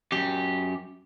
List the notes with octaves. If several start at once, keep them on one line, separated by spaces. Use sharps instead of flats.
F#2 G4